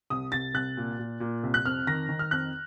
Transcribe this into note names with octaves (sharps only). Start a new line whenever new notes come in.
C2 D#6
C2 A6
C2 F#6
A#2
A#2
A#2
C2
F#6
F2 F6
D#3 A#6
D#3
F6
F2 F#6